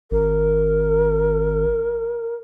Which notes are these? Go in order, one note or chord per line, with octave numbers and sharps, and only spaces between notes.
G#1 A#4